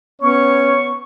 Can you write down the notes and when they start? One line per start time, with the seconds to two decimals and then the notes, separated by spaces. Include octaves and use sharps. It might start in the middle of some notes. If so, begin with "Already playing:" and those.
0.22 B3 C#4 C#5 C#6